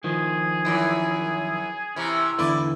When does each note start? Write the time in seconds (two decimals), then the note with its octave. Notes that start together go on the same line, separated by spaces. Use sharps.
0.04 D#3 F3 G#4
0.65 F#2 A#2 E3
1.96 C3 E3 C#4
2.39 E2 D3 E4 B4 D5